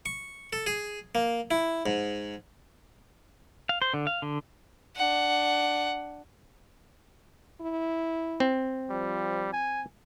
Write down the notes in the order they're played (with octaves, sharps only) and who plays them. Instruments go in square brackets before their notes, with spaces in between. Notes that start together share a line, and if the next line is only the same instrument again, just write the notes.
[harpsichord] C#6
A4
G#4
A#3
E4
G#2
[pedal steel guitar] F5
C5
D3
F5
D3
[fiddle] D4 F#5
[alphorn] E4
[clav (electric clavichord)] C4
[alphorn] F3 [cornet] G3
[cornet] G#5